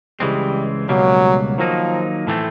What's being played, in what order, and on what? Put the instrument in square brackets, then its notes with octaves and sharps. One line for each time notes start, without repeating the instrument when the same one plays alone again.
[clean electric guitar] C#2 C#3 E3 G#3 C4 [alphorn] G3
[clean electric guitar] C#2 B2 G3 A#3 [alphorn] F#3
[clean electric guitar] D#3 F#3 A#3 D#4 [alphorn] F3
[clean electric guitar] A2 E3 A3 C4